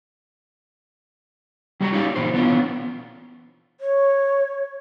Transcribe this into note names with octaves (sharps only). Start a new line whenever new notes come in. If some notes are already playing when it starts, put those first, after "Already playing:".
G3 G#3 F#4 G4 A#5
C#4 D#4 G4 D5 F5
A#2 E3 D#4 C5
E3 B3 C#4 D4 F4
C#5